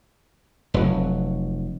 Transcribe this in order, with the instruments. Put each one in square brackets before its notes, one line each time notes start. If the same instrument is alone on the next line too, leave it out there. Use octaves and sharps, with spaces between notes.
[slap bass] F1 F#3